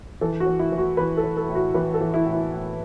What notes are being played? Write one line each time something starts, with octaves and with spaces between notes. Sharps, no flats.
E3 A4
F#4
E3
E4
E3
F#4
E3 B4
A4
E3
A4
A2
F#4
E3 B4
A4
E3
E4
A2
E4
A2